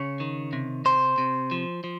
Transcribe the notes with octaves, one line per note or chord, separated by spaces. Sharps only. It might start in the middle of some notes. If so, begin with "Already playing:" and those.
Already playing: C#3 C#5
D#3
C3
C3 C5
C3
F3
F3